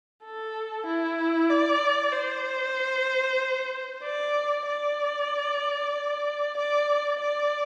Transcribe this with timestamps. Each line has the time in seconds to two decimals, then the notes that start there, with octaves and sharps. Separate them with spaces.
0.24 A4
0.86 E4
1.50 D5
2.13 C5
4.03 D5
4.67 D5
6.57 D5
7.20 D5